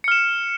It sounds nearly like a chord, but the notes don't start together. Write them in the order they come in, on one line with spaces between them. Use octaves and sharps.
C#7 F6 E7